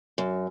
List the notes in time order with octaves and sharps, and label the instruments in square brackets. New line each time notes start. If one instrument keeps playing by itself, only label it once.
[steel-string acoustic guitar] F#2